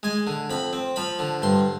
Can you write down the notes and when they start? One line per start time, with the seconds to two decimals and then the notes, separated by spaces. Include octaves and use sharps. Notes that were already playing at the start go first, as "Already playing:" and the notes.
0.03 G#3 G#5
0.27 D3
0.50 F2 B5
0.73 C4
0.96 F3 B5
1.19 D3
1.42 G2 C6